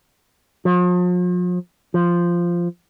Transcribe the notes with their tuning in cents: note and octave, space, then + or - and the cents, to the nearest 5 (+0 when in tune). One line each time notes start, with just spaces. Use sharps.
F3 +40
F3 -5